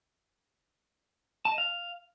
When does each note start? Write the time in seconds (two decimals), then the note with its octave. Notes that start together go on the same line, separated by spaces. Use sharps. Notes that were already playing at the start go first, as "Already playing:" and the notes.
1.45 A5
1.52 D#5
1.58 F5